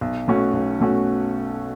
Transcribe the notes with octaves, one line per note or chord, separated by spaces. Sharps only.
B1
B2 A3 C#4 F#4
B1
B2 A3 C#4 F#4